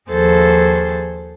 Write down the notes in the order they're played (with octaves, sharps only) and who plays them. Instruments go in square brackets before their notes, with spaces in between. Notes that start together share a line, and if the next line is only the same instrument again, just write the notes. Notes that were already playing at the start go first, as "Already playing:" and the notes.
[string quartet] D#2 F3 G#4 A4 C5 A6